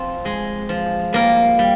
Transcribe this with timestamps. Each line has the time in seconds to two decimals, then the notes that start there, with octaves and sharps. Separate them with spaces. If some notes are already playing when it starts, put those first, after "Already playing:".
Already playing: F3 C4
0.25 G#3
0.69 F3
1.13 G3 A#3 A#4
1.59 G3